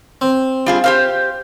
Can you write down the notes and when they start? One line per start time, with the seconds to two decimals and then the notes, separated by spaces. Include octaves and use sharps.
0.21 C4
0.66 G3 F4 G#4
0.84 G4 C5 F5